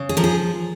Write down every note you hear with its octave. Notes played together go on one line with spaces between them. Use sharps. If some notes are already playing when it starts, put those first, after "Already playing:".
Already playing: C#3
G#4
F3 A#4
G#4